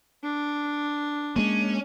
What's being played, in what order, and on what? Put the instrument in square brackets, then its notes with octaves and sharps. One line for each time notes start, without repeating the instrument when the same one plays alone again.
[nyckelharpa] D4
[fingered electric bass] G#3 A#3 [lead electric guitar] C#4